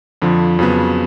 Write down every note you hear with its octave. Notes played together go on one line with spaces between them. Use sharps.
F2 D3 F3
F2 C#3 F#3 B3